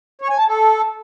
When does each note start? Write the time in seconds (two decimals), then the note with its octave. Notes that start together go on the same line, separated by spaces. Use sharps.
0.21 C#5
0.30 G#5
0.38 A5
0.47 A4